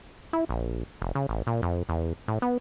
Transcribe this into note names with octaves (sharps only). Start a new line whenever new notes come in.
E4
A#1
F1
C#3
A1
A#2
F2
E2
A2
B3